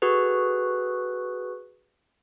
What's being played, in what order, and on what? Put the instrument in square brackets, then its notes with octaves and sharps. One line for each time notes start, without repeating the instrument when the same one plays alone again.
[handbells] F#4 G#4 A4 B4